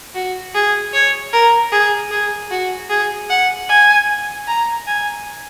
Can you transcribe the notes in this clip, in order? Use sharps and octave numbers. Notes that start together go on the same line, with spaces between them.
F#4
G#4
C#5
A#4
G#4
G#4
F#4
G#4
F#5
G#5
A#5
G#5